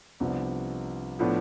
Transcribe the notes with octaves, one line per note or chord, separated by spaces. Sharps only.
C2 C3 F3 B3 D4
A2 F3 B3 D4